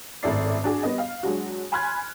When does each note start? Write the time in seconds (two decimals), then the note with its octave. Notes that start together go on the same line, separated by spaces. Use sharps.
0.23 G#1 F#2 A2 E4 D5 C7
0.64 D4 F#4 G#4
0.83 G3 B3 D#5
0.98 F5
1.23 F#3 G#3 D4 F#4
1.72 G#5 B5 C6 F6 F#6 G#6